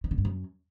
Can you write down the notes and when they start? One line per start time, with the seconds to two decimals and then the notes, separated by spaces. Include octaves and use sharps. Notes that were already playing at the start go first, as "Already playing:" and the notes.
0.04 D#3
0.11 D3
0.18 G2
0.25 F#2